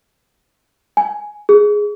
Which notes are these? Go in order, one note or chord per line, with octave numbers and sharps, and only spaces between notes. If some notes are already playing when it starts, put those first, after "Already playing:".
G#5
G#4